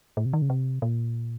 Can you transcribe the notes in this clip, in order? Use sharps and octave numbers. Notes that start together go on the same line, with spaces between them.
A2
C3
D#3
C#3
C3
A#2